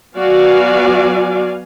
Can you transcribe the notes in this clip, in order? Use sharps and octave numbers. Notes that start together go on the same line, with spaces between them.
F#3 B3 F#4 D5 F5 G#5